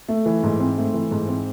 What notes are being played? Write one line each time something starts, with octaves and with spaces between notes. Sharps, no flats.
A3
E3
G#2
C4
A3
E3
G#2
C4